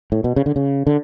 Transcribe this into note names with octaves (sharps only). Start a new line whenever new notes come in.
A2
B2
C#3
D3
C#3
D3